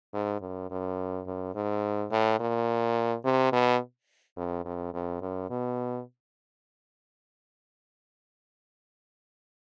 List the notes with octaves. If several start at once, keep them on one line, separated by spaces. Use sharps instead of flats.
G#2
F#2
F#2
F#2
G#2
A2
A#2
C3
B2
F2
F2
F2
F#2
B2